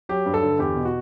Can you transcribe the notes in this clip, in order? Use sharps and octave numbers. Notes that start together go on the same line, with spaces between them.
F#3 G4
G2
A4
D3
E2 G4
B2
F#4